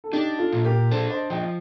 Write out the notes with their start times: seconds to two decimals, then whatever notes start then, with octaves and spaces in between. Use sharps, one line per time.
0.04 A4
0.12 D4 D#4 G4
0.38 F4 A4
0.53 A#2
0.65 G4 A#4
0.91 D4 A4 C5
1.10 C5 D#5
1.30 F3 D#5 G5